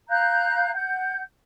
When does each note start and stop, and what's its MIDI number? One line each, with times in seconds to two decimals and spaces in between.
0.09 0.70 77
0.09 0.70 82
0.09 0.70 90
0.09 0.70 91
0.74 1.21 78
0.74 1.21 91